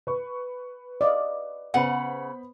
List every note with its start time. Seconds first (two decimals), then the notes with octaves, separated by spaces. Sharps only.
0.07 B4 C#6
1.01 D5 D#5 F5
1.74 C#3 B3 C5 F#5 B5